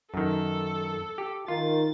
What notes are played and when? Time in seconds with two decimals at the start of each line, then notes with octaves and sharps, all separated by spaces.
0.14 F#2 D#3 A4
1.18 G4
1.48 D#3 F4 A6